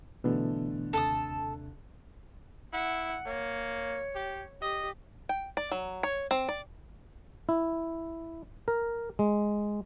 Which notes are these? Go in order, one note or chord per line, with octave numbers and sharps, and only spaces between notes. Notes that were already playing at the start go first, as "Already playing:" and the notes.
B2 D3 E3 A3 B3
D#2 C3 A4 A5 D#6
E4 F#5
A#3 C#5
G4
G4 D#5
G5
D5
F#3
C#5
C4
D5
E4
A#4
G#3